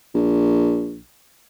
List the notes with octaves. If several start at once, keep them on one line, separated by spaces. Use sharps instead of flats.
A#1